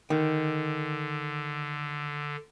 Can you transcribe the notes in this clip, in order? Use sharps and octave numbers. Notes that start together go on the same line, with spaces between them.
D3 D#3